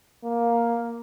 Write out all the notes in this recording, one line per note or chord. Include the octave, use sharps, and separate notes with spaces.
A#3